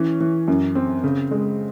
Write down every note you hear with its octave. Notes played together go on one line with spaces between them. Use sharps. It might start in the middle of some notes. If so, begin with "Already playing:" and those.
Already playing: E3 C#4
E3
F#2
C4
C#3
G#3